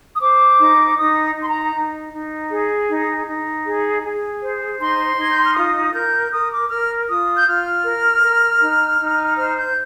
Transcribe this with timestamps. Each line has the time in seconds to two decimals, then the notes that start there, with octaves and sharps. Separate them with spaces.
0.14 D#6
0.21 C5 D6
0.60 D#4
0.97 D#4 D#6
1.35 D#4
1.41 C6
1.48 A#5
1.74 D#4
2.13 D#4
2.50 G#4
2.89 D#4
3.27 D#4
3.65 G#4
4.03 G#4
4.42 C5
4.79 D#4 C6
5.17 D#4 G#6
5.33 G6
5.45 F6
5.55 F4 D#6
5.94 A#4 G6
6.32 A#4 D#6
6.51 D6
6.70 A#4 F6
7.09 F4 D#6
7.38 G6
7.47 F4 F6
7.84 A#4
8.23 A#4
8.61 D#4
8.99 D#4
9.38 C5 F6
9.57 G6